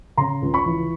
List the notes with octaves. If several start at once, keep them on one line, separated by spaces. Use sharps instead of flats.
C#3 A#5 C6
C#2
B5 C#6
E3